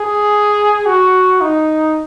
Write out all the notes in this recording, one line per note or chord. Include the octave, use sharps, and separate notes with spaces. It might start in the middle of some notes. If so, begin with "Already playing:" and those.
Already playing: G#4
F#4
D#4